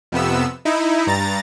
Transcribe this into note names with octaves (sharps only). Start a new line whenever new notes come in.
F2 C3 B3 E6
D#4 E4
G2 A#5 A6